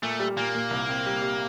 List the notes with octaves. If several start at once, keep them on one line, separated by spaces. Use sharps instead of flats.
A#2 A3
G3
A#2 A#3
A#2
C2
C4
G3
G3